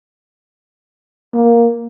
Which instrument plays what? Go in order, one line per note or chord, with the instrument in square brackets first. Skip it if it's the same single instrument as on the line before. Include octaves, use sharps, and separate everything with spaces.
[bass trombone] A#3